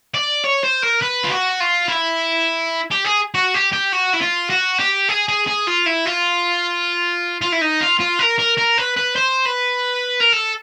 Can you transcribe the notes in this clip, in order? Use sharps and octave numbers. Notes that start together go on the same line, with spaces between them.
D5
C#5
C5
A#4
B4
F4
F#4
F4
E4
G4
G#4
F#4
G4
G4
F#4
E4
F4
F#4
G4
G#4
G#4
G#4
F4
E4
F4
F4
E4
D#4
F4
F4
A#4
A#4
A#4
B4
B4
C5
B4
A#4
A4